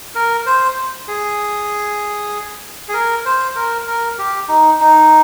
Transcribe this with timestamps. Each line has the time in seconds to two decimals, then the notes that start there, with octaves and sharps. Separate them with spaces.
0.15 A#4
0.46 C5
1.08 G#4
2.89 G#4
2.93 A#4
3.26 C5
3.56 A#4
3.87 A#4
4.18 G4
4.49 D#4
4.80 D#4